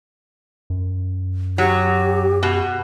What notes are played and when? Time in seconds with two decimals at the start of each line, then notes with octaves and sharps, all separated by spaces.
0.70 F#2
1.58 F#3 G4
2.43 B2